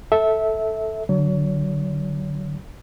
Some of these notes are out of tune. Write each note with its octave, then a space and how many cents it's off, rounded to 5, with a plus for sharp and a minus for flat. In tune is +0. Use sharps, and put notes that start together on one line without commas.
A4 +0 E5 -15
D3 +0 F#3 +10 C#5 +35